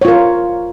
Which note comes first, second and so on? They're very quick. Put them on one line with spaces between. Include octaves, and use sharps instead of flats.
C#5 F4 A#4